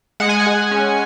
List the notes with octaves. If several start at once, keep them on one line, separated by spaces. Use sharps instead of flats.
G#3 F#5
G#5
F#5
G#3
C#4